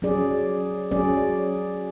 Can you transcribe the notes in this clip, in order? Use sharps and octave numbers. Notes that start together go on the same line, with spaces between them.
F#3 C#4 G#4 D5
F#3 C#4 G#4 D5